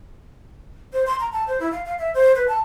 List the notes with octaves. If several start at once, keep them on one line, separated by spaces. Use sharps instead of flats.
C5
C6
A#5
A5
C5
E4
F5
F5
E5
C5
B4
A5